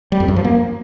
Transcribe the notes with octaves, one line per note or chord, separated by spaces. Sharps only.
G3
F2
F#2
F3
A#3